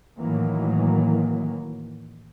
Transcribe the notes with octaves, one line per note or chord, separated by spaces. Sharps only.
A2 D#3 E3 F#3 A#3